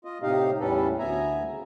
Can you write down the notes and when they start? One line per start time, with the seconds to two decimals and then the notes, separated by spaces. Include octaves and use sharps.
0.05 F4 D#5
0.23 A2 C3 D#4 G4 D#5 F5
0.60 E2 A2 G3 C#4 A4 B4
0.99 D2 B3 E5 G#5 A#5
1.46 C#3